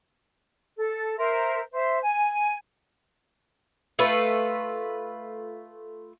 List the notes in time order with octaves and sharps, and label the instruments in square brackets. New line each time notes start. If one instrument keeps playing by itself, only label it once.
[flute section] A4
A#4 C5 E5
C5 E5
G#5
[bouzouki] A3 F4 B4